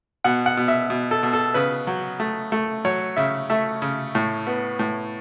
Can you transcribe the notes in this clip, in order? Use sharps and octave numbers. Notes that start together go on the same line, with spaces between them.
B2 F#5
F#5
B2
E5
B2
A4
B2
A4
C#3 B4
F#3
A3
A3
F#3 C#5
C#3 E5
A3 E5
C#3
A2
B3
A2